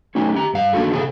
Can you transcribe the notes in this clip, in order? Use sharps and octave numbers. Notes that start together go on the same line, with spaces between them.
A3 C#4 D#4 F#4
G4 A#5
G2 F5
A#3 D4 F#4 A4
C3 G#4 A4